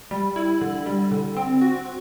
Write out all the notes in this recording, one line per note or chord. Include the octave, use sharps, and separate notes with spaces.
G3
E4
D3
G3
D3
C4
F#4